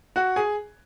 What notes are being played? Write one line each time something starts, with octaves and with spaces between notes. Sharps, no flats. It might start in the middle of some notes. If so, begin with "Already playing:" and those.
F#4 F#5
G#4 G#5